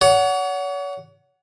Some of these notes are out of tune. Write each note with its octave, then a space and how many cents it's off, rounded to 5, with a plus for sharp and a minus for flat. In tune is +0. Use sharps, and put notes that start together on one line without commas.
C#5 +40 F#5 +0